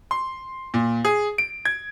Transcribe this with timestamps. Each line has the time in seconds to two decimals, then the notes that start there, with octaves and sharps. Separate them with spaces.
0.11 C6
0.74 A#2
1.05 G#4
1.38 D7
1.65 G#6